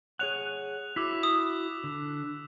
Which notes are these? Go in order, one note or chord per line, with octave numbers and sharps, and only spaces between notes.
G#4 C#5 F#5 F#6 F7
E4 F#4 D6 E6 B6
D#6
D3